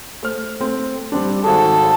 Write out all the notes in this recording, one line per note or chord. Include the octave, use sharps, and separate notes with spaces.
A3 C5 F6
A3 C4
G3 C4 D4
G#1 F#4 G#4 A4